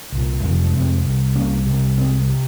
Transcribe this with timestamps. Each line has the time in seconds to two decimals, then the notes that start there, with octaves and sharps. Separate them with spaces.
0.12 C2 A#2
0.43 F2 C3 D#3
0.53 F3
0.64 F3 G#3
0.75 F2 C3 G#3 C4
1.05 C2 C3
1.35 C2 C3 A#3 C#4
1.66 C2 C3
1.97 C2 C3 G#3 C4
2.30 C3